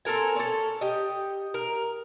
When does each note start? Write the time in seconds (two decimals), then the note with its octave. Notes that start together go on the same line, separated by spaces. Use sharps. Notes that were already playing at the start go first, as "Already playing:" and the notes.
0.05 C4 A4 A#4 G#5
0.36 C#4 A4
0.81 G4 D#5
1.54 A#4